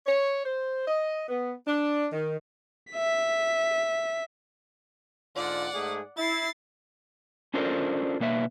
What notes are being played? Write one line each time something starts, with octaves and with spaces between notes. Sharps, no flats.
C#5
C5
D#5
B3
D4
D#3
E5 B6
G#2 D3 F4 D5 F#5
G#2 A3 G#4
E4 A6 C7
C#4 D4 F4 A4 A#4 C5
B2 A#3 B4 E5